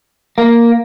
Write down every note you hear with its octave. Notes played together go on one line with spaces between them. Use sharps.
A#3